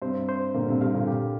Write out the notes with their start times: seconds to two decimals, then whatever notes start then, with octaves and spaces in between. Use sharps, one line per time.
0.02 G2 C3 C5
0.29 C5
0.54 A#2 D3 A#3
0.68 G2 C3
0.81 G2 C3 F5
0.94 A#2 D3
1.08 G4